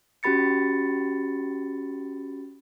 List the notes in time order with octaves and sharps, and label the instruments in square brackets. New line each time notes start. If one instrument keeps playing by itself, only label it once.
[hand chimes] C#4 F#4 G4 B5 A6 C#7